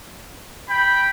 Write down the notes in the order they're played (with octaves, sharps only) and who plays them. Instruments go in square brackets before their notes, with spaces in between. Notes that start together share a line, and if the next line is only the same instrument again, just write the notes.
[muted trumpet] G5 [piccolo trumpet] B5